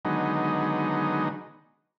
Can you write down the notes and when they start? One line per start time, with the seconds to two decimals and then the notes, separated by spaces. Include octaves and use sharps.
0.05 D3 D#3 F#3 G#3 B3 D#4